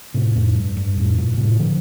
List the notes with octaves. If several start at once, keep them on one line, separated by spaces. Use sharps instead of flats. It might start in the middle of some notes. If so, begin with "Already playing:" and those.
A2 C3
F2 A2
G2
G2
F2 A2
G2 A#2
A2 C3
D3 F3